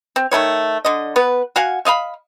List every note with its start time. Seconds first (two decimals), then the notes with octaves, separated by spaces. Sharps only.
0.16 C4
0.31 D#3 A3 B3 C#5
0.85 D3 D#5
1.16 B3 B4
1.56 F#4 F5 F#5 G#5
1.85 A3 D#5 F5 B5